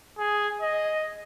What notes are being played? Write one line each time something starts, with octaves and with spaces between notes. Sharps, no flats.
G#4
D#5